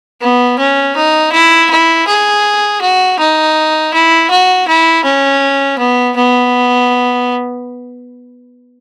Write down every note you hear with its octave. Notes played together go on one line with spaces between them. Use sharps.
B3
C#4
D#4
E4
E4
G#4
F#4
D#4
E4
F#4
E4
C#4
B3
B3